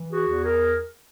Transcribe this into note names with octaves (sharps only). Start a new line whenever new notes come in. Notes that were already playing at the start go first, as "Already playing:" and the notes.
Already playing: E3
F#4 G#4
E2
G#4 A#4